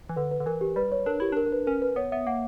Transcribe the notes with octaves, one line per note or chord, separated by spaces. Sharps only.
E3
D3 B4
B4
D3
E3 A#4
G4
G3 B4
C#5
D4 A#4
E4 G4
D4 A#4
A#4
B4
C#4 A#4
B4
B3 C#5
B3 E5
A#3 F#5